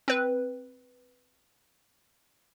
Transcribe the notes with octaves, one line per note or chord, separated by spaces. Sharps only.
C4 B4